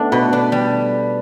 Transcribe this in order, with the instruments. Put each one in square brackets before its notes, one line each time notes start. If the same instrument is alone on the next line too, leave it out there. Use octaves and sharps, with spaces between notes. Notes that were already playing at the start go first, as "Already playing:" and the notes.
Already playing: [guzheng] A3 B3 D4 [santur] A4
[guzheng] B2 [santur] B4
[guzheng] D4
G3